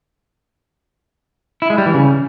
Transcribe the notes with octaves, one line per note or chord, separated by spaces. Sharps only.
E4
G#3
G3
E3
C#3